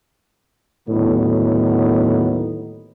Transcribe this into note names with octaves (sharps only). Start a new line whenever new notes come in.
D#2 A2 D3 F#3 B3 D#4